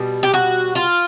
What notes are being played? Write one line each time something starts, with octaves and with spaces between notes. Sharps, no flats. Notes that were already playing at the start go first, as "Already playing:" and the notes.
Already playing: B2 G3
G4
F#4
F4